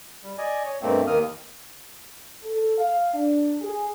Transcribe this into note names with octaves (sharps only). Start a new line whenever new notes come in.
G3
D5 D#5 G#5
C#5
G2 B2 A3 A#3 C4
D#2 D#3 A#3 D#6 F6
A4
F5
D4
G#4